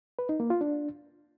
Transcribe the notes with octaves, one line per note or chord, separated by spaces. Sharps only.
B4
D#4
A#3
F4
D4